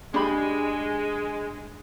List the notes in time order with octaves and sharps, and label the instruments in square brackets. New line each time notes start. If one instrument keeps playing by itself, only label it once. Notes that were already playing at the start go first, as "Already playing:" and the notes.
[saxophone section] G#3 [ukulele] D4 G4 B5